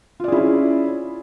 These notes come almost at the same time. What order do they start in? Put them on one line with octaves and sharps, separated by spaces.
F4 D5 G#4 E4 C#4